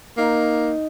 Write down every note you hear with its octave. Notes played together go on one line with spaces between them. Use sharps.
A#3 D#4